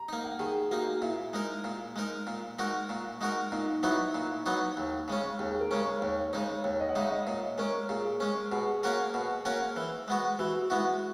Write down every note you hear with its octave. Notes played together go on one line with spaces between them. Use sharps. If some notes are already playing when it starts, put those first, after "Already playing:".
Already playing: A#5
A#3 D#4
F#5
D#3 G#4
A#3 D#4 F#4
A#2 E4
G#3 D#4 A#4
A#2
G#3 D#4 A#4
A#2
G#3 D#4 F#4 A#4
A#2
G#3 D#4 F#4 A#4
A#2 D#4
F#3 B3 D#4 E4 F#4
A#2
F#3 B3 D#4 F#4
D#2
C#3 G#3 C#4
D#2 G#4
A#4
C#3 G#3 C#4
C#5
D#2 C#5
C#3 G#3 D#4 C#5
D#2 C#5
D#5
F#5
C#3 G#3 D#4 E5
D#5
A#2 C#5
G#3 C#4 A#4
A#2 G#4
G#3 C#4
B2 G#4
A#3 C#4 F#4 A#4
B2
A#3 C#4 F#4 A#4
E3
G#3 B3 F#4
E3 F#4
G#3 B3 E4 F#4